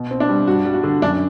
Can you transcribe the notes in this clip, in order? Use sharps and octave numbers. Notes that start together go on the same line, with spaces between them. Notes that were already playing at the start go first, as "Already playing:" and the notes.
Already playing: B2
C4
D4
G3
G2 F#4
G3
F#4
D3
F#2 D4